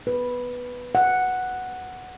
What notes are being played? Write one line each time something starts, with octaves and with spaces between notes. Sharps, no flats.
B4
F#5